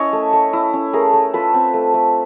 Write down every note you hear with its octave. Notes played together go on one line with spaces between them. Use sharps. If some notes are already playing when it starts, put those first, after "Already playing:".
Already playing: C#4 E4 C#5 D#5
A3
A3
E4
C#4
A3 G#4 A#4
A3
F4 A4 B4
C4
A3
A3